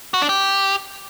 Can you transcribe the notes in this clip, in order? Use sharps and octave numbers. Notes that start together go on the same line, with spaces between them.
F#4
D4
G4